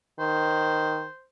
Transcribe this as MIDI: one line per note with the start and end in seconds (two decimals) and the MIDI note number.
0.19 1.04 51
0.19 1.26 72